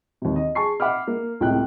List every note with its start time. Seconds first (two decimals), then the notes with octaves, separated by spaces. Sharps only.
0.22 D#2 C3
0.36 D#5
0.55 G#4 A5 C#6 C7
0.80 E5 F#5 B5 D6 F6
1.07 A#3
1.40 C#2 A2 C3 G5 F#6